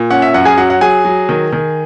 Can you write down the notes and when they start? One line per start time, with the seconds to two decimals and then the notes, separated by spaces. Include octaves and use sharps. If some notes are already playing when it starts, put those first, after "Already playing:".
Already playing: A#2
0.10 C#4 F#5
0.22 E5
0.34 F#2 F#5
0.45 G#4 G#5
0.58 F#3 F#5
0.70 F#5
0.81 F#3 G#4 G#5
1.05 F#3
1.29 D#3
1.53 D#3